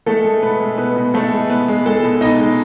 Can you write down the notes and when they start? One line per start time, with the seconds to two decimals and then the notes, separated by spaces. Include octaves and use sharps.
0.06 G#3 A3 A4
0.24 G#3
0.42 B2 B3 B4
0.60 G#3
0.78 B2 B3 B4
0.96 B2
1.14 G#3 A3 A4
1.32 G#3
1.50 B2 B3 B4
1.68 G#3
1.86 G#3 A4 A5
2.03 B2
2.21 B2 D#4 D#5
2.40 G#3